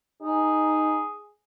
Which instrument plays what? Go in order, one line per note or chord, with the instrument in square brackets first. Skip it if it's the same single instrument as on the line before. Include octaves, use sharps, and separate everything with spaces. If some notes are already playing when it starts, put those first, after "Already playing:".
[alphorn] D#4 [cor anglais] G#4